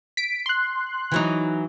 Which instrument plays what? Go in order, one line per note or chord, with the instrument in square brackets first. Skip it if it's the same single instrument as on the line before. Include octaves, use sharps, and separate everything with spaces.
[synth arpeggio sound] B6 D7
C6 F#6
[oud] E3 F#3 D#4